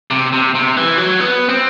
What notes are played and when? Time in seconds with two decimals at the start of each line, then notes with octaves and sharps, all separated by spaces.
0.11 C3
0.32 C3
0.55 C3
0.77 E3
0.98 F#3
1.20 B3
1.49 C4